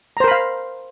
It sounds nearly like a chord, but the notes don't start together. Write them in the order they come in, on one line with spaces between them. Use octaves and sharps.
A#5 C5 A#4 B5 F5